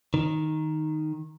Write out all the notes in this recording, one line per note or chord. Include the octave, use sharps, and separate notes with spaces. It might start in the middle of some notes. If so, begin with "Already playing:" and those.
D#3